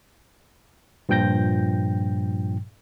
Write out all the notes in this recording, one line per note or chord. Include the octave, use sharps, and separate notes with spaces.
G2 A#2 F3 G5 G6 A#6